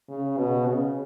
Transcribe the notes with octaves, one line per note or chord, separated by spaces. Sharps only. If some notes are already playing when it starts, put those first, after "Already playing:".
C#3
B2
C#3